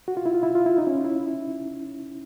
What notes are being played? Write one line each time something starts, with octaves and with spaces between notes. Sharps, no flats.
F#4
F4
E4
F4
E4
F4
E4
D#4
C#4
E4